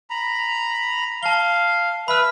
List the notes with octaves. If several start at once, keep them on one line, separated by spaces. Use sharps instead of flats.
A#5 B5
F5 A5 G7
B4 E5 B5 F6